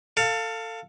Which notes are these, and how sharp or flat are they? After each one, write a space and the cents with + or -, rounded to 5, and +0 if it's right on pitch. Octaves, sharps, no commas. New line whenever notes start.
A4 +25 F5 +0